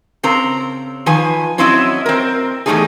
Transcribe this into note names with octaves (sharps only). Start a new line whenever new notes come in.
C#3 C4 A#4 A#5
D#3 F3 B4 G#5
F#3 C4 C#4 E4 D#5 E5
C4 A#4
E2 A2 G3 A3 D#4 G#4